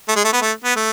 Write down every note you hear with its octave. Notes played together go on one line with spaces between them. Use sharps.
A3
G#3
A3
B3
A3
B3
A3